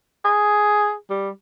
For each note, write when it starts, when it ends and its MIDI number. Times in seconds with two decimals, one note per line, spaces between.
0.25 0.94 68
1.10 1.30 55